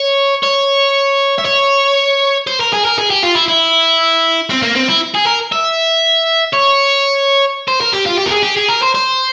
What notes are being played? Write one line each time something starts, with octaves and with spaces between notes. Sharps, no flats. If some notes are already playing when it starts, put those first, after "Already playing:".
Already playing: C#5
C#5
E5
C#5
C5
A#4
G#4
A#4
G#4
G4
F4
E4
E4
C4
A#3
C4
E4
G#4
A#4
E5
C#5
C5
A#4
G4
F4
G4
A#4
G#4
G4
G#4
A#4
C5
C5